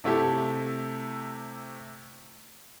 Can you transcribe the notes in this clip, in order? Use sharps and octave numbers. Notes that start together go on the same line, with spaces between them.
C3 A3 E4 G4 A4